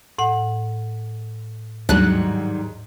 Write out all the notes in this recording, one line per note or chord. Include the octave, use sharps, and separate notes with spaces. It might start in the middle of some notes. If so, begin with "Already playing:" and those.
A2 F#5
D#2 G#2 D#3 F#3 G3 D4 F#6